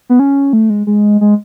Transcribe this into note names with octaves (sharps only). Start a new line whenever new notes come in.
B3
C#4
A3
G#3
G#3
G#3